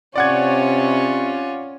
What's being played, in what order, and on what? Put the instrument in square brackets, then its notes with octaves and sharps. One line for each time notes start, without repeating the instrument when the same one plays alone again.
[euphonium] C3 [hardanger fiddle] C#4 C#5 [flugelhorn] F4 [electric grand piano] D5 F#5 G#6